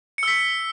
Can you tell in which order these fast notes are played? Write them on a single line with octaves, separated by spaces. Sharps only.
C#7 E6 B6